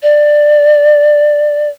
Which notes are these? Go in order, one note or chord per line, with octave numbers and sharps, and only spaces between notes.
D5